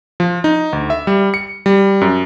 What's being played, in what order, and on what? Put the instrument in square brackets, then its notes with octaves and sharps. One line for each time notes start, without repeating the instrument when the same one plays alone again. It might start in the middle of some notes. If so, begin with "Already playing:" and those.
[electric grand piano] F3
D#4
D2
E5
G3
C#7
G3
F#2